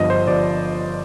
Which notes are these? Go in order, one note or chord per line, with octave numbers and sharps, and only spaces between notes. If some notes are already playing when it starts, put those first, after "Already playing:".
Already playing: G1 G2 F3 D#5
C5
G1 G2 F3 D5